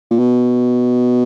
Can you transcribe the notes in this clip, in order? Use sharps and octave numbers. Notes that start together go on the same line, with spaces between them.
A#2
B2